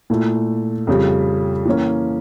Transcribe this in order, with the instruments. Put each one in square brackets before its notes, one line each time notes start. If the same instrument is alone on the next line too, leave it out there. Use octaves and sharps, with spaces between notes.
[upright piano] A#2 A3 E4
F2 C#3 G3
E3 A#3 C#4